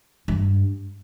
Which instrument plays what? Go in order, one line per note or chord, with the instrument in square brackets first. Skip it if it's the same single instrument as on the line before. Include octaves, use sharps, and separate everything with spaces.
[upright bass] G2